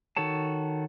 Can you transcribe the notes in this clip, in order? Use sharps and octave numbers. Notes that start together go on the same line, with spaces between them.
D#3 F#4 A4 C#5 A5